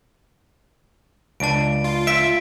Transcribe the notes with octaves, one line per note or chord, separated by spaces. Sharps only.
C#2 D4 A5 D7
F4
E5 B6 D7